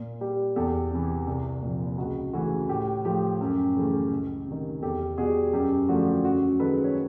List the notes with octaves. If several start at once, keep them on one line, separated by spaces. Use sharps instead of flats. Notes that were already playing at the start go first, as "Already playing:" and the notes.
Already playing: A#2
G3 G4
E2 G4 A4
C3 E3
C2
A#2 F3
C#2 F#4
C#3 E3 A3 F#4
A2 G4
F3 A3 G4
F#2
C#3 E3 A3
C#2
C3 D#3
E2 G4 A4
B2 G3 F#4 G#4
F#2 G4
D3 F3 A3 F#4
F#2 F#4
D#3 G#3 A4 B4
C#5